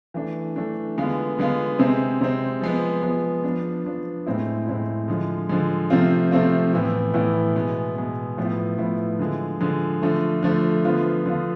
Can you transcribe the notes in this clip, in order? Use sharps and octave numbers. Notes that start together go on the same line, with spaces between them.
E3 A3 D4
E3 A3 D4
D3 G#3 B3 F4
D3 G#3 B3 F4
C3 G#3 C4
C3 G#3 C4
F3 G#3 B3
F3 G#3 B3
F3 B3 D4
F3 B3 D4
A2 G#3 C4 E4
A2 G#3 C4 E4
D3 F3 G#3
D3 F3 G#3
C3 F3 A3 C4 F4
C3 F3 A3 C4 F4
A2 E3 B3 E4
A2 E3 B3 E4
B2 G#3 B3
B2 G#3 B3
A2 F3 B3 E4
A2 F3 B3 E4
D3 F3 G#3
D3 F3 G#3
D3 F3 A3
D3 F3 A3
D3 F3 B3 F4
D3 F3 B3 F4